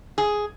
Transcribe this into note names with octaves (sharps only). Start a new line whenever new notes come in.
G#4